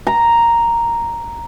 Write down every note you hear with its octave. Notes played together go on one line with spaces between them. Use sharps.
A#5